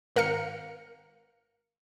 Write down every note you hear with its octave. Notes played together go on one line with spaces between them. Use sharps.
G#1 A#4 F5 F6 C#7